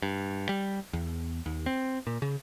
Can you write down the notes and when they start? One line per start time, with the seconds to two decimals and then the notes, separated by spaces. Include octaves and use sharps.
0.02 G2
0.49 G3
0.93 E2
1.46 D#2
1.66 C4
2.07 A#2
2.22 C#3